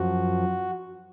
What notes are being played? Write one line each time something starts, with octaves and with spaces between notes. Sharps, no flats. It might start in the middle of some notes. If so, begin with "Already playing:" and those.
Already playing: F#2 F3 F#4